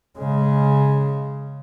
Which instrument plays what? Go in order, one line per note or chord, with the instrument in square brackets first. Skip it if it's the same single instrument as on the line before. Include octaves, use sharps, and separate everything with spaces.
[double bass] C#3 G#3